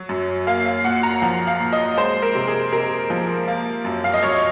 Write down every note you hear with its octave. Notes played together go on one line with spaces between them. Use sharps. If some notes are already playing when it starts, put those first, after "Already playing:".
Already playing: F#3
F#2
A#3 F5
F5
A#2 F#5
A#5
F3 F#5
F5
A#2
D#5
G#3 C5
A#4
C3
G#4
C3 A#4
F3
A#3
F#2
F5
D#5
F#2 C#5